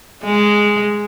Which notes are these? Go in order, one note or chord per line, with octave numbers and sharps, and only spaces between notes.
G#3